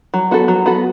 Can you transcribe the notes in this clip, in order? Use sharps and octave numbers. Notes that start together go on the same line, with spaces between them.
F#3
B3 F#4 A4
F#3
B3 F#4 A4